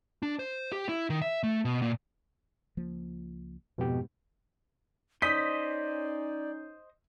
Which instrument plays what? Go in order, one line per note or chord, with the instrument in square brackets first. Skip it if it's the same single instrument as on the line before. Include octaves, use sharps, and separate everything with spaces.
[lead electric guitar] D4
C5
G4
E4
D#3
E5
A3
B2
A#2
[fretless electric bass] C#2 F3 A#3
[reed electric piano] F2 G4 [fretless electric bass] G#2 [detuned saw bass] B2
[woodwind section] C#4 D#4 [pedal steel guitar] C5 D#5 [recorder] D5 [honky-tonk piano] B6